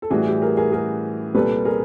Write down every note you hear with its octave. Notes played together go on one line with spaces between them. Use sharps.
A4
A2 E3 G3 F#4 G#4
G4
G#4 A#4
G#4 A#4
G#4 A#4
C2 A#2 G3 A4 B4
G#4 A#4